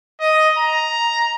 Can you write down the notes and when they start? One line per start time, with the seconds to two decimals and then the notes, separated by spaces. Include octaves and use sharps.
0.20 D#5
0.58 A#5